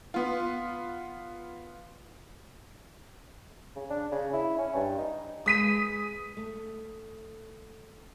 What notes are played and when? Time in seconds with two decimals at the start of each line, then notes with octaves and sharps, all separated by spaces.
0.14 B3 F4
3.76 C#3
3.90 D4
4.12 C#3
4.33 E4
4.58 C#4
4.75 G2
4.98 D#4
5.46 G#3 B4 D#6 B6 D#7
6.37 A3